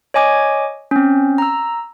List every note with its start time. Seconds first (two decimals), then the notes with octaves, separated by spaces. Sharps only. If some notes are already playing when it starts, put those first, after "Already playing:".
0.14 C#5 D#5 G#5 D6 G#6
0.91 C4 C#4
1.38 A#5 E6